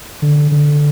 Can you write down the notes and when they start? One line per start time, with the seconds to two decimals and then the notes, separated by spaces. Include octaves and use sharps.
0.22 D3
0.51 D3